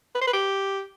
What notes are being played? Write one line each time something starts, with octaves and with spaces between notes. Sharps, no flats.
B4
C5
B4
G4